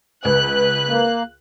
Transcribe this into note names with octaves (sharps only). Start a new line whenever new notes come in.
C#2 B4 F#6
A#3